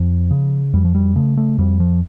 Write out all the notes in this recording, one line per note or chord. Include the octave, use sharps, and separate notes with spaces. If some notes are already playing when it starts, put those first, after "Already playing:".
Already playing: F2 F3
C#3
F2 G3
F3
G3
C#3 A3
A3
F2 G3
F3